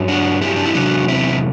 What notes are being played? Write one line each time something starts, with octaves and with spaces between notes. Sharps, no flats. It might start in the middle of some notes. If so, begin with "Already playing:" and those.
Already playing: G2 F#3
D4 F#4
E4 G4
D4
E4
E2 C3 F#3 D4 F#4
C4 E4